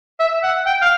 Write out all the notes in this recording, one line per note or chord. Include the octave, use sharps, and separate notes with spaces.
E5
F#5
G5
F5